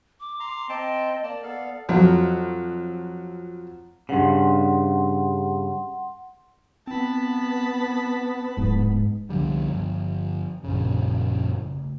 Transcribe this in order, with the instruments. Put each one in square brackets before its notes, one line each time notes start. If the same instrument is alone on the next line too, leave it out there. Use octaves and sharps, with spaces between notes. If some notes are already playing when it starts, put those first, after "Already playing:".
[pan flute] D6
[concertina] A#5 C6
[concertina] C4 G5 A5 [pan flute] D#5
[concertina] A#3 A5 [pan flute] D5
[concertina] B3 A4 F5
[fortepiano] F2 F#3
[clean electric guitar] G2 C#3 [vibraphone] F#5 C6
[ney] B3 [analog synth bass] C4 [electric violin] A5 B5
[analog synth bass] D1 [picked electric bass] G#2
[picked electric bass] C2 D3 G3 [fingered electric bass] F3
[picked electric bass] G1
[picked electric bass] A#1 C#3 [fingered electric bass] F#2
[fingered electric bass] C#3 A3